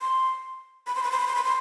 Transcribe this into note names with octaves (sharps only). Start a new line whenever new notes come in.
C6
B5
C6
B5
C6
B5
C6
B5
C6